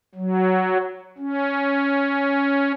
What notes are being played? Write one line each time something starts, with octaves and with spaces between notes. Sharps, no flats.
F#3
C#4